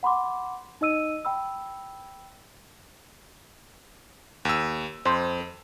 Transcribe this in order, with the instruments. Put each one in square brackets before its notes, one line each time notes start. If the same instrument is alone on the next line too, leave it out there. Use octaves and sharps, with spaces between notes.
[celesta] F#5 B5 C6 D6
D#4 D#5 E6 D#7
G5 B5 E6
[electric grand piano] D#2 E6
[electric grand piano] F2 [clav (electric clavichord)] C5